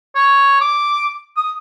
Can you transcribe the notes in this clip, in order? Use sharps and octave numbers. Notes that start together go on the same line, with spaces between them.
C#5
D6
D#6